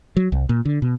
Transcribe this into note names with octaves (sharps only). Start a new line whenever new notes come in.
F#3
C2
A#2
D3
B2